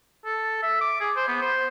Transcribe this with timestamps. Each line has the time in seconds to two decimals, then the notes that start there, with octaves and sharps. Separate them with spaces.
0.25 A4
0.63 E5
0.81 D6
1.00 G#4
1.16 C5
1.28 B3
1.42 C5